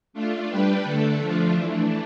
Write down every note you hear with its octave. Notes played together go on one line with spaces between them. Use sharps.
A3 D4 F4
G3 D4 G4 B4
D3 A3 D4 A4
F3 A3 D4 F4
E3 A3 D4